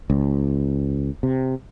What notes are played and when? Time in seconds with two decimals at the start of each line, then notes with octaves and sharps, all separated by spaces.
0.10 C#2
1.23 C3